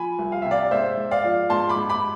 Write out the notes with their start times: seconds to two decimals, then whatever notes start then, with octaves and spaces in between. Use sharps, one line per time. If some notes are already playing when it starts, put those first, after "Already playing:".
Already playing: F3 G#5 B5
0.19 C2
0.32 F5
0.42 C3 E5
0.51 D5 F5
0.71 G#2 C5 E5
0.97 G#2
1.11 D5 F5
1.24 F3
1.50 G#2 A5 C6
1.69 B5 D6
1.76 G#2
1.90 B5 D6